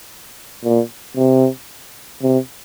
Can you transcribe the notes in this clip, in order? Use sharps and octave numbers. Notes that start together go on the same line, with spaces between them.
A#2
C3
C3